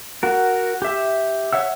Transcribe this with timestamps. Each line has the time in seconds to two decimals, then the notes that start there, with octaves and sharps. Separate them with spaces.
0.23 F#4 A#4
0.82 G4 E5
1.53 C#5 E5 F#5 E6